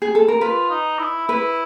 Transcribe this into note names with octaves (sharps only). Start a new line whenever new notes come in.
G#4
A4
A#4
F4 B4
D#4
E4
E4 B4